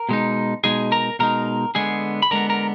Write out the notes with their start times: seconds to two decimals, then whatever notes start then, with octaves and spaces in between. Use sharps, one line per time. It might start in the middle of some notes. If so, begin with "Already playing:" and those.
Already playing: A#4
0.09 B2 G#3 D#4
0.64 B2 G#3 D#4 G#4 G#5
0.92 A#4 A#5
1.19 B2 G#3 D#4 A#4 A#5
1.75 D3 G#3 B3 G#4 G#5
2.22 B5
2.31 D3 G#3 B3 A#4 A#5
2.50 A#4 A#5